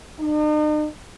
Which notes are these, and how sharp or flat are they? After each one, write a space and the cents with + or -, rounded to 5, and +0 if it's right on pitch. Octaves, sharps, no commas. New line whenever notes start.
D#4 -45